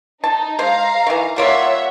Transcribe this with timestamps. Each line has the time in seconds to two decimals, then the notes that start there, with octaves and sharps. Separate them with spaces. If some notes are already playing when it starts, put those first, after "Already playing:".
0.24 D#4 A5
0.59 G#3 C5 F5 A#5
1.07 D#3 E3
1.36 G3 A#3 F4 C#5 E5 F#5